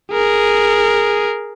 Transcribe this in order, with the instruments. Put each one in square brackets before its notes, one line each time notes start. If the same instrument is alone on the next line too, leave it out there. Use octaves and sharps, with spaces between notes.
[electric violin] G#4 A#4